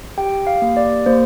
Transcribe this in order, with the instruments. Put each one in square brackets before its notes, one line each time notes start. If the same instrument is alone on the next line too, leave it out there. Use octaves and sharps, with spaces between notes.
[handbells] G4 G5
F5
A#3
D5
A#3 C5